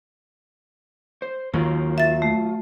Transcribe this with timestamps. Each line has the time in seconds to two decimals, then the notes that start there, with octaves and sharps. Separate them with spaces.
1.22 C5
1.54 D#2 D#3 F#3 F4
1.98 E5 A6
2.22 A3